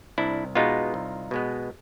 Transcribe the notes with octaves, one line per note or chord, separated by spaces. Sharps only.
C2 D4 E4
B2 G#3 B3 D#4 F4
C2
B2 G#3 B3